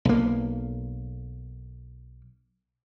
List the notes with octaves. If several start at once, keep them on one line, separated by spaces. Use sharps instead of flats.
B1 A#3